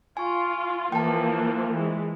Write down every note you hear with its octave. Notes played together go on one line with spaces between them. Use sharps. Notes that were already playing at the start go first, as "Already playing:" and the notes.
F4 G#5 C#6
E3 F3 A#3 G5 A5
E3 G#3